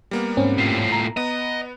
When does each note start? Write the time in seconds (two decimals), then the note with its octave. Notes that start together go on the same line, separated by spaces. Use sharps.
0.11 G3 A#3 B3
0.37 G#2 C4 C#4
0.58 A2 F4
0.92 A#5
1.17 B3 D#5